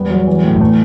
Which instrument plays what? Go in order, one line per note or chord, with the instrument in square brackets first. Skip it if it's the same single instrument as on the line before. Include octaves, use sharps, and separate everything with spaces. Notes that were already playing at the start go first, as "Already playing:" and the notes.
Already playing: [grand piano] E2 B3 [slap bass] G3
[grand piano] F#3
E3
A2
[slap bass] G3
[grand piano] E3 [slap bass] A3